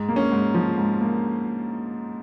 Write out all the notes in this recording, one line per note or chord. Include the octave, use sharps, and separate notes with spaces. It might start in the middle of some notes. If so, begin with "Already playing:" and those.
Already playing: G#2
A#3
C#4
G#2
F3
G#2
A#3